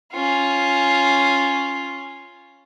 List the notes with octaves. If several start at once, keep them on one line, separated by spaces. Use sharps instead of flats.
C#4 F4